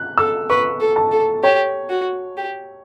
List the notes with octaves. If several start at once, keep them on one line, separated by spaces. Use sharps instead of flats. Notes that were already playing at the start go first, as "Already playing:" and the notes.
Already playing: F#6
A4 E6
B4 C#6
A4
A5
A4
G4 C#5
F#4
G4